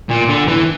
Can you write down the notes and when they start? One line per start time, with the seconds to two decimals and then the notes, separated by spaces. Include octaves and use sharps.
0.09 A#2
0.29 D3
0.48 E3